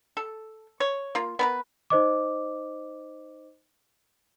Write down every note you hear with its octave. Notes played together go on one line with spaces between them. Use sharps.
A4
C#5
A#3 F4
B3 A#4 B4
D#4 C5 D#5 D6